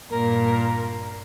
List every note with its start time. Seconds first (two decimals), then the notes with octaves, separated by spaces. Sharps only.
0.11 G2 A#2 A#4